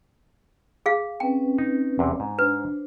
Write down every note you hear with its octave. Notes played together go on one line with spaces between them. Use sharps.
G#4 F5
C4 C#4 B4 G5
D#4
E2 C3
G#2
D4 B4 C5